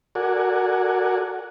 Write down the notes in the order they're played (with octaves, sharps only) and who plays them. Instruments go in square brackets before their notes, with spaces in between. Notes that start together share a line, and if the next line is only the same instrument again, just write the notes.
[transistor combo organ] F#4 A4 A#4 D5 F#5 G#5